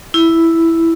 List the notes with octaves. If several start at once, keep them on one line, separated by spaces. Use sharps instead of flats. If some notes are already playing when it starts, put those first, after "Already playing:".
E4